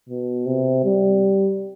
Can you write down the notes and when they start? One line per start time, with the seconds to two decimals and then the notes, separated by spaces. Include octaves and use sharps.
0.09 B2
0.46 C3
0.85 G3